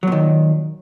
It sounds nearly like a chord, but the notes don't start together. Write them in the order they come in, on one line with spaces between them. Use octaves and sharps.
F#3 A#2 D#3